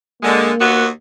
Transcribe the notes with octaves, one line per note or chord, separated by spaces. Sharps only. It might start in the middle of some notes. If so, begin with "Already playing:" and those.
D3 G#3 A#3
D#2 B3 F#4